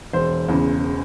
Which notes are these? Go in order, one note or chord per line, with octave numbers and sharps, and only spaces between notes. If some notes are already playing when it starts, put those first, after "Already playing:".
E1 C5
E2 C#3